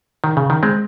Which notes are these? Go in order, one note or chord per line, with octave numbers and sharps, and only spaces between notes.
D#3
C#3
D#3
G#3 C4